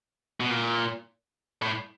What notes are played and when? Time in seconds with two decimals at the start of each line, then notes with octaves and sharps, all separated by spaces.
0.40 B2
0.50 A#2
1.62 A2